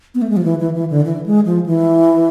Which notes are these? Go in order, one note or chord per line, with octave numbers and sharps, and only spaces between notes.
B3
A3
G#3
F3
E3
E3
E3
D3
E3
G#3
F3
E3